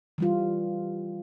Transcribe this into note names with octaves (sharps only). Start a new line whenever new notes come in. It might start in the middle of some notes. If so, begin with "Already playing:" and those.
E3 G3 F4